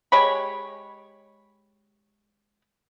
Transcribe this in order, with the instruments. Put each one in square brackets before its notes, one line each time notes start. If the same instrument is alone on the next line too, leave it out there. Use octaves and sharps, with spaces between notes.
[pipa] G#3 G4 C#5 B5